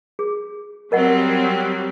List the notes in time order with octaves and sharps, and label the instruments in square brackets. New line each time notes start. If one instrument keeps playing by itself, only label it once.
[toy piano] G#4
[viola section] F#3 G3 C4 [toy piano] A#4 D#5 F#5